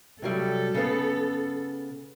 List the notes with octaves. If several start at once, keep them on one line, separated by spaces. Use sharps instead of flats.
C3 F#3 G3 A4
C#3 B3